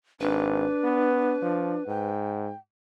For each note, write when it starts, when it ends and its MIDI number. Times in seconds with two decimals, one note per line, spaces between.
0.21 0.66 32
0.21 1.87 62
0.21 2.10 71
0.84 1.35 59
1.42 1.77 53
1.88 2.51 44
1.88 2.57 79